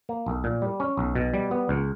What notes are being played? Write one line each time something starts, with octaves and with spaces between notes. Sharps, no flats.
A#3
B1
A#2
G3
C#4
B1
B2
G3
B3
C#2